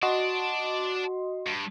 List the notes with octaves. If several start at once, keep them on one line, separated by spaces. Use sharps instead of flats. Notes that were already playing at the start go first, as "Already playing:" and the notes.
F#4 D5 D#5 A5 C6
G2